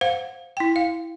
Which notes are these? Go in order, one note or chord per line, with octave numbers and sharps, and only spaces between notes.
C5 F5 F#5
E4 G5
F5